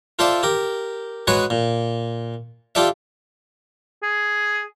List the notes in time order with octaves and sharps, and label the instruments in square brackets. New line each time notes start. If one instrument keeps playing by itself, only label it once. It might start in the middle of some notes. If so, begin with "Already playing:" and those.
[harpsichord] F4 A4 C5 D5 E5
G4 A#4
G#3 F#4 G#4 B4 C#5
A#2
F4 G4 A4 D5 E5
[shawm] G#4